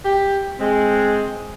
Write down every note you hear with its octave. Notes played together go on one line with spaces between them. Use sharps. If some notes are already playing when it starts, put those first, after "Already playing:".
G4
G#3 C4